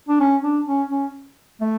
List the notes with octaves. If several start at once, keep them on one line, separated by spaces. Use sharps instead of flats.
D4
C#4
D4
C#4
C#4
A3